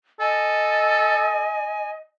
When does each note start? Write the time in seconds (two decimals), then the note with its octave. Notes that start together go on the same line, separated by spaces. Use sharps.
0.20 A4 D#5 G#5